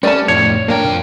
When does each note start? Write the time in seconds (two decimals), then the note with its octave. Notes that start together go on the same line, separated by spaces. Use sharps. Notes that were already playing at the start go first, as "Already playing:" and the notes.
0.03 G3 A3 C#4 D5 A5
0.28 F2 A2 C#5
0.68 F2 A#3 D4 A#4 G5